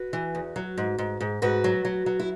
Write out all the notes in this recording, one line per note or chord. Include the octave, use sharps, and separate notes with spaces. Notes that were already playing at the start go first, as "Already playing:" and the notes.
Already playing: F#4 B4
E3
E2
F#3
G#2
G#2
G#2
G#2 F#4 B4
F#3
F#3
F#3
E4